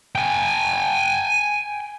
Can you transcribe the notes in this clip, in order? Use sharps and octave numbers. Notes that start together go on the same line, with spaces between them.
G5 G#5